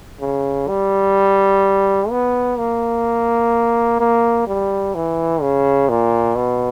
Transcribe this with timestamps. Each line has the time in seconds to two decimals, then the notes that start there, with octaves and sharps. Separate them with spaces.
0.21 C#3
0.68 G3
2.10 B3
2.58 A#3
4.00 A#3
4.47 G3
4.95 E3
5.42 C#3
5.89 A#2
6.36 B2